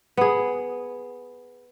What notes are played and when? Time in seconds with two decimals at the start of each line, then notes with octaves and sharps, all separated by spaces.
0.17 B3 G#4